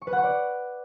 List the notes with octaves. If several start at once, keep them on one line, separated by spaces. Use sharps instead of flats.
C#6
B4
F#5
C#6
D5